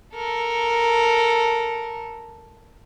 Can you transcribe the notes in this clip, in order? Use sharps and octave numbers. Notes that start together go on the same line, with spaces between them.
A4 A#4